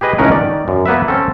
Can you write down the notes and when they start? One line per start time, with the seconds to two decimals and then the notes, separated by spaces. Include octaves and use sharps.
0.01 G4 G#4 B4 D#5
0.18 C#2 A2 C#4 D#4 A#4 F#5
0.32 D#3 D5
0.68 F#2
0.86 A#3 B3 B4 E5
1.08 C4 C#4 A4